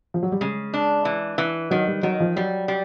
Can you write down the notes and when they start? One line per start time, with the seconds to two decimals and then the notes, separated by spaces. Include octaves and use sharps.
0.14 F3
0.22 F#3
0.32 G3
0.41 C#3 G#3
0.74 D4
1.05 E3
1.38 E3
1.71 D#3 F#3
1.87 G3
2.03 D#3 F#3
2.20 F3
2.36 F#3 G3
2.68 G3